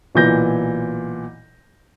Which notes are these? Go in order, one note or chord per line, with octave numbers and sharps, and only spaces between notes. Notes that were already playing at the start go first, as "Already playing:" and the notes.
B1 A#2 E3 G6 A#6